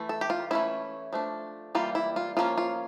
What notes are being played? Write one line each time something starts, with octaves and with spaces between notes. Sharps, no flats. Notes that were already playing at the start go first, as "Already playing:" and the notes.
Already playing: E3 A3
A4
G4
F4
E3 A3 C#4 E4
F3 A3 D4
E3 G3 A#3 F4
E4
F4
F3 A#3 C#4 F4
F4